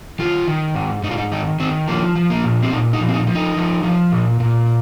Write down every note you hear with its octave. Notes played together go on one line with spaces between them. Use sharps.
D#3 F4
D#3
G#2
G#2 D#4
F4
D#4
D#3 D#4
D#3 C4
F3 A#3
F3
A#3
A#2
C4
A#2 D#4
D#4
F3
C4
D#4
F3
D#4
F3
F3
A#2
A#2